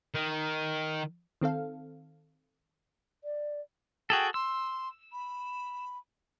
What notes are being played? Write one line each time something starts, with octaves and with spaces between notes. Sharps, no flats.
D#3
D#3 C4 A4 F5
D5
F#4 G#4 A4 G5
C6 E6
B5